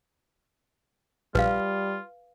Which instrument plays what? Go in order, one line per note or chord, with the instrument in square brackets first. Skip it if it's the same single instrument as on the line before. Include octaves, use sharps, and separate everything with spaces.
[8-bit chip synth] A#1 [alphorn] G3 [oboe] F4 [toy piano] B4 F5